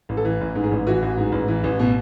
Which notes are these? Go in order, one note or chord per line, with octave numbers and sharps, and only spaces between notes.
A1
A4
E3
A1
G#2
G#4
A1
E3 F#4
A1
G#2
A1
E3
A1
B2